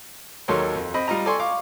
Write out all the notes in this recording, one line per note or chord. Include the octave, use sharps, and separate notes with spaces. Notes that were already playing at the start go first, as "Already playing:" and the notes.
D#2 F#3 A4 A#4 C#5 C6
F2
C4 D#5 B5
G3 F4 D#5 A#5
A4 D5 G#5 C6 C#6
F5 C#6 D6